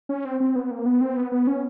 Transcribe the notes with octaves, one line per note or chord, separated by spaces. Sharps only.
C#4
C4
C4
B3
A#3
B3
C4
B3
B3
C#4